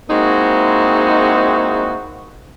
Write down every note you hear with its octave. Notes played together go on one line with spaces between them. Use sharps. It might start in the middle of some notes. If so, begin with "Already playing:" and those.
G#3 A#3 C4 D#4 E4 F#4